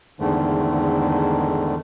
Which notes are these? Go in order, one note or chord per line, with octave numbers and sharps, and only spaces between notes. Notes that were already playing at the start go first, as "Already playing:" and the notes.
E2 G#2 D3 D#3 A3